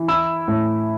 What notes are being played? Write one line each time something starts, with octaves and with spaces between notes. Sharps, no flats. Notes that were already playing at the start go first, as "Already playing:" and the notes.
Already playing: E3
E4 E6
A2